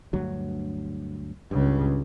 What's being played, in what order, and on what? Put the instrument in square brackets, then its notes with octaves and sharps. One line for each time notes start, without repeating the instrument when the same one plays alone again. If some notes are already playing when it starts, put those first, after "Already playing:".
[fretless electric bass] D2 G2 F#3
[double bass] C#2 C#3 [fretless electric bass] G2